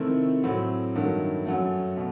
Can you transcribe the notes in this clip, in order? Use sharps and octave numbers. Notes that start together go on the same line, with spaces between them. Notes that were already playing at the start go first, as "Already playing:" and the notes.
Already playing: C3 D#3 A3 C4 E4
A2 F#3 C4
G2 D#3 F#3 A3
F#2 F#3 A3
B2